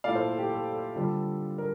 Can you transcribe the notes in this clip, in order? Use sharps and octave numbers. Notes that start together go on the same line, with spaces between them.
A#2 A3 E4 D5 F5
A4 C5
A4
G4
A4
A4
D3 G3 D4 F4
A#4